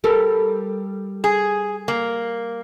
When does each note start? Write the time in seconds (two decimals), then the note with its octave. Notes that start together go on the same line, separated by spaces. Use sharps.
0.04 G3 A4 A#4
1.24 G#4
1.88 A#3